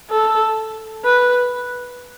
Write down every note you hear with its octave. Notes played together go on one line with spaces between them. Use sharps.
A4
B4